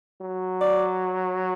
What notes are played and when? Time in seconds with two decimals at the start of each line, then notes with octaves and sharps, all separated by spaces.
0.21 F#3
0.61 D5